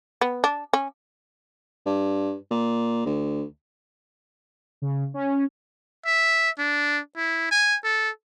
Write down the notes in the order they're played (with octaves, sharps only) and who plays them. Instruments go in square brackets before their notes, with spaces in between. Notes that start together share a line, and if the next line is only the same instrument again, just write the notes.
[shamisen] B3
D4
C#4
[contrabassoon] G2
A#2
D2
[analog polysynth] C#3
C#4
[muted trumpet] E5
D4
E4
G#5
A4